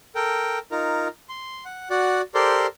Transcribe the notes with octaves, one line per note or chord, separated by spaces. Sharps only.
A4 A#4 G5
D#4 F4 A#4
C6
F#5
F#4 D5 F#5
G4 A4 A#4 C5 D5 C6